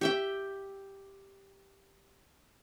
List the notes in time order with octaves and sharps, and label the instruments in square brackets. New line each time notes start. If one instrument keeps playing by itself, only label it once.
[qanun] G4 E5 G5